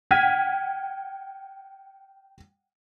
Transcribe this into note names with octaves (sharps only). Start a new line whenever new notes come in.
F#5 G5 F6 G#6 B6 D#7